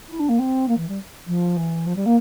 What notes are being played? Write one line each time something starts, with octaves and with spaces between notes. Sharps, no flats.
E4
D4
A#3
C4
A#3
E3
G3
F3
E3
F3
G3
A#3